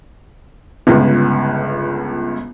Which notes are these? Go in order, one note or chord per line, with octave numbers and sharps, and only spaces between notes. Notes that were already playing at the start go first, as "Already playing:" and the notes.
G1 C#2